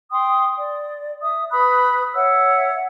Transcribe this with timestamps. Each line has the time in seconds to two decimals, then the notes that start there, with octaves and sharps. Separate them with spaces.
0.11 G5 C6 D#6
0.58 D5
1.22 E5 D#6
1.51 B4 B5 D#6 F#6
2.14 C#5 E5 F#5 E6